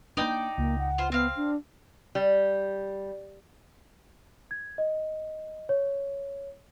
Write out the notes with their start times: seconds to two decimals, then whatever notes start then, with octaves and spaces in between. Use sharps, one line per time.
0.17 A#3 B3 D4 D#4 D5 G5
0.58 C#2 A#3
0.79 F#5
0.98 F4 C5
1.12 B3 C4 F5
1.37 D4
2.15 G3
4.51 G#6
4.78 D#5
5.69 C#5